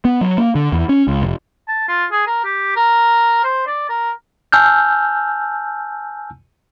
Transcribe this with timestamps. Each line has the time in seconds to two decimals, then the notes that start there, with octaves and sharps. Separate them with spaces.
0.05 B3
0.21 F#3
0.38 A#3
0.55 D3
0.72 E2
0.89 C#4
1.08 C#2
1.22 F1
1.68 A5
1.88 F4
2.12 G#4
2.27 A#4
2.45 G4
2.76 A#4
3.44 C5
3.67 D5
3.89 A#4
4.52 G#5 A5 E6 F6 G6